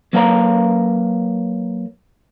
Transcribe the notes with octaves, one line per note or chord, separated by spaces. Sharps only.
F#3 A#3 B4 F5 A#5